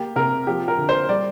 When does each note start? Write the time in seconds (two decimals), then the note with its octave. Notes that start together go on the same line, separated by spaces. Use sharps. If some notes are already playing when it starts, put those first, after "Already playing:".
Already playing: A#3 G4
0.16 C3 A#4
0.47 F3 G4
0.68 A#4
0.78 D3
0.89 C5
1.09 G3 D5